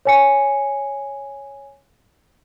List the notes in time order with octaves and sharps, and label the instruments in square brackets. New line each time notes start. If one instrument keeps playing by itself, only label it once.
[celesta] C#5 G#5 C#7